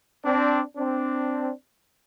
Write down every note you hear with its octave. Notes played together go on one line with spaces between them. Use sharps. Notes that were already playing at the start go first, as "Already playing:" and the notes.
C4 D4
C4 D4